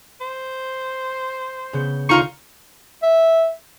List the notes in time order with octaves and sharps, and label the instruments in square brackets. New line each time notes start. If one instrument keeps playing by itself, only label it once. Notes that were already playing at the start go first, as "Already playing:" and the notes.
[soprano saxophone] C5
[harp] C#3 B3 G6
[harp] D2 [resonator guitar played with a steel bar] D#4 F4 A#5 [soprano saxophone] C#6
[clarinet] E5